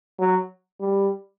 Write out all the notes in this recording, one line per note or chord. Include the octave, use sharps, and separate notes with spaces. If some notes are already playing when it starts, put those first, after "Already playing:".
F#3
G3